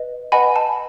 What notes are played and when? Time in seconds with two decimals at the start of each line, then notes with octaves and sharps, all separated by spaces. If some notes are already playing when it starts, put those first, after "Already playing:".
Already playing: B4 D#5
0.32 B4 D#5 F#5 G#5 B5
0.56 A5